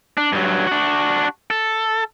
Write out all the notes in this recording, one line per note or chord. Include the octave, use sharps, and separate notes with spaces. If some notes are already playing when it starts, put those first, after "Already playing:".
D4
G2 F#3
D4 F#4
A4